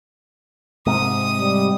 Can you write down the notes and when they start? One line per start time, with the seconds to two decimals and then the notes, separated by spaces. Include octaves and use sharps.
0.87 G#2 C3 D#6
1.37 G3